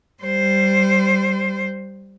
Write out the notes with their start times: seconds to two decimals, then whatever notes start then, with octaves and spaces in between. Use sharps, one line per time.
0.23 G3 C5